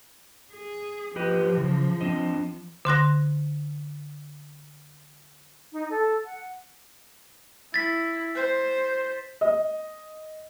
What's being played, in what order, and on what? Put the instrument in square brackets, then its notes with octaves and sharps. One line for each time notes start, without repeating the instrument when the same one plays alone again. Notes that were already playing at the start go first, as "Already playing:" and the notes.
[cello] G#4
[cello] F3 [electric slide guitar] G4 B4 D#5
[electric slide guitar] C#3
C4 D4 D#5
[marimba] D3 C6 F#6 A#6
[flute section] D#4
A4
F#5
[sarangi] E4 [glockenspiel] A6 B6
[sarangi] C5
[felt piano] D#5